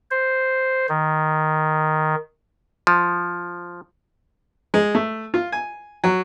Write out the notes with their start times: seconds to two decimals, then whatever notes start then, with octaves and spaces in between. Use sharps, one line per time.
0.11 C5
0.89 D#3
2.87 F3
4.74 G#3
4.95 A3
5.34 F4
5.52 G#5
6.04 F#3